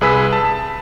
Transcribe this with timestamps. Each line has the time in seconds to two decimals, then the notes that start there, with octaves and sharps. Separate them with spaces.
0.01 C2 G#4 B4 E6 B6
0.33 A5